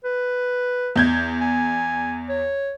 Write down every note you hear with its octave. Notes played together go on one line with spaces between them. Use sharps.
B4
E2 G6 G#6
G#5
C#5